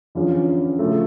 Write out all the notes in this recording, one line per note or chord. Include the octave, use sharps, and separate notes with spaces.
E2 D3 F3 C#4 F4
C#3 F3 A3